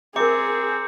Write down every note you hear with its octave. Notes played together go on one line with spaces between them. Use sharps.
C4 G#4 A#4 E5 A#5 D6 C#7